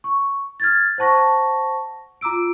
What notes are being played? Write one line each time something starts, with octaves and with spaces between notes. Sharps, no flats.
C#6
F6 G#6 A6
C5 F#5 A5 C#6 A#6
F4 A#5 D6 E6 D7